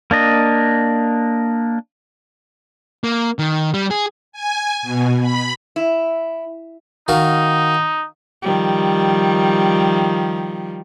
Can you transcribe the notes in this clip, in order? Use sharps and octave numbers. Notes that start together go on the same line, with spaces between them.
A#3 D4 D#5
A#3
D#3
G3
G#4
G#5
B2
B5
E4
D#3 D#4 F#4 F5
D#3 F3 G3